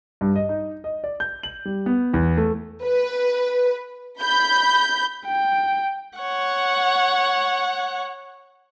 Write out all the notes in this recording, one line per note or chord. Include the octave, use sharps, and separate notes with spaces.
G2
D#5
D#4
D#5
D5
G6
F#7
G3
B3
E2
A3
B4
B5 G6
G5
C#5 F#5